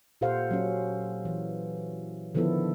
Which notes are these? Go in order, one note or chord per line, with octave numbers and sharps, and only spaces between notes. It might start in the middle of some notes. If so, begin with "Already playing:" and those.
A#2 G4 A4 C5 F5 F#5
F#3 C#4
E3
D3 D#3 F3 B3 E4 A4